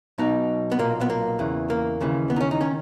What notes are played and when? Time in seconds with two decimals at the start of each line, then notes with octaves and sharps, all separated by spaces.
0.18 B1 B2 D#4
0.72 B3
0.79 B1 A#2 A#3
1.01 B3
1.10 A#3
1.39 E2 C#3 E3
1.70 A#3
2.01 D#2 C#3 E3
2.30 B3
2.36 D#4
2.41 C#4
2.51 D#4
2.61 D#3 C#4